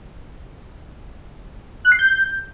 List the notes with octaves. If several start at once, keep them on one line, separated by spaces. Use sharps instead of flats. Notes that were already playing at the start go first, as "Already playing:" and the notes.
F#6
C7
G6